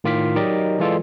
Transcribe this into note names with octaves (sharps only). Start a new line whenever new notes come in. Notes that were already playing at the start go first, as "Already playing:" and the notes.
A2 D#3 F4 D6 F6 B6
F#3 D#4 G4 A#4 D5 D#5
E3 G#3 F4 A4 D5